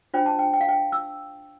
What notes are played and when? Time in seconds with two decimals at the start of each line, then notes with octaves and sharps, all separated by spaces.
0.14 D4 F4 C5 G5
0.26 A5
0.39 G5
0.53 G5
0.61 F5
0.69 G5
0.92 E6